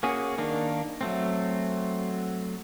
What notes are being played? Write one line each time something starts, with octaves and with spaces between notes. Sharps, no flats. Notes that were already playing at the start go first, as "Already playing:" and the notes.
A#3 C#4 F#4 G#4
D#3 A#3 D4
F#3 A3 C4